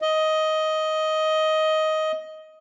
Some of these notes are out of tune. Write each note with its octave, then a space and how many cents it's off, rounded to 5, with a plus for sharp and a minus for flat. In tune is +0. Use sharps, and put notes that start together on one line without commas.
D#5 +10